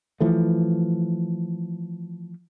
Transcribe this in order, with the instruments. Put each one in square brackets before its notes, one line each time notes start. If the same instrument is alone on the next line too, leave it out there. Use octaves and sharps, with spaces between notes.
[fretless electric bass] E3 F3 A3